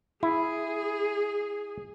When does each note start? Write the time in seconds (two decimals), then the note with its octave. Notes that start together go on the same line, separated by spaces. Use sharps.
0.23 E4 G#4